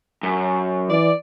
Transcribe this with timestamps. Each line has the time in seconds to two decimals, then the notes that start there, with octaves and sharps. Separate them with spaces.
0.23 F#2
0.90 E3 D5